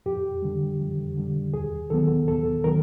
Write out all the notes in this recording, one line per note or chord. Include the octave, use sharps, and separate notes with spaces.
F2 G4
D3 G3
F2
D3 G3
D#2 G#4
D#3 F#3 B3 A4
D#2 A4
D#3 F#3 A#4